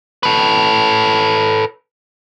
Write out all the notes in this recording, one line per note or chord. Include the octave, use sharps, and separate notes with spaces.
A4 B4